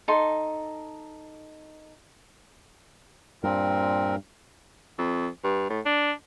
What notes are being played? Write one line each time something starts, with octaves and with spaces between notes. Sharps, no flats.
D#4 A4 C6
G2 A#2 C4 A#4
F2
G2
A2
D4